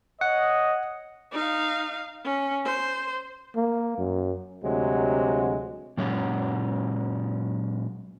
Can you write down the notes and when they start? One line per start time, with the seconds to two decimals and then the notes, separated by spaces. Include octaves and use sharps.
0.21 C#5 D#5 F#5
1.32 D#4 F5
2.24 C#4
2.65 C5
3.56 A#3
3.98 F#2
4.64 D2 C3 F#3 G#3
5.97 A#2 F#3 G#3 C#4